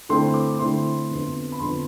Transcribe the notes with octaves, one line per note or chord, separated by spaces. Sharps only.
D3 A3 C4 E4 C6
D6
D3 A3 C4 E4 C6
F2 D3 F3 B3
B5
F2 D3 F3 B3 C6